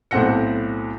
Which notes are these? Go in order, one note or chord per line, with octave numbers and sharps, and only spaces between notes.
B1 A2 C4 F#5 A#6 C#7